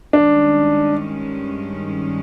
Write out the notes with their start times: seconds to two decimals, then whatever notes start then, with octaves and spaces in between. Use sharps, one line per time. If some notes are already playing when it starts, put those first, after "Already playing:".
0.13 G2 D#3 G#3 C#4 D4